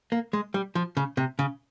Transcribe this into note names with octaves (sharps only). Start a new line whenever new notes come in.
A#3
G#3
G3
F3
C#3
C3
C#3